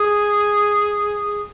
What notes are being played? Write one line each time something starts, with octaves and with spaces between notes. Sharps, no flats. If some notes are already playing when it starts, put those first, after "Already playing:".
Already playing: G#4